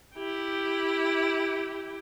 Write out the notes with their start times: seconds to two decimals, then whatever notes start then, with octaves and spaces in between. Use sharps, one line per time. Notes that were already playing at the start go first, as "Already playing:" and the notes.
0.15 E4 G4